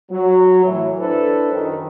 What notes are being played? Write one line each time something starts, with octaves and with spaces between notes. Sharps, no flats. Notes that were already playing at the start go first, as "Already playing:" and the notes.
F#3
A2 E3
D4 E4 A4 B4 C5
F#2 D#3